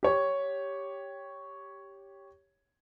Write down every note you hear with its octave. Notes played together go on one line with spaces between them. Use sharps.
G4 C#5